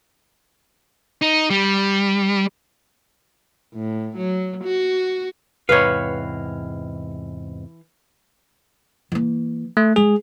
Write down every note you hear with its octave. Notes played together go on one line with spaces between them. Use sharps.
D#4
G3
A2
F#3
F#4
E2 G#2 C3 E3 B4 C#5 F5
E3 A#3
A3
G#3 G#4